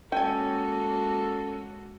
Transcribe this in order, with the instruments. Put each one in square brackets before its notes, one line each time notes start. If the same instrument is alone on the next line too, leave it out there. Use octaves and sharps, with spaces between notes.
[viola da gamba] G#3 A#3 F#4 [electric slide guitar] C#4 [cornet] A4 [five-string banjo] G5 G#5